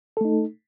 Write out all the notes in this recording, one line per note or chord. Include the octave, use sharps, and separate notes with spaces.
A3 D#4 A4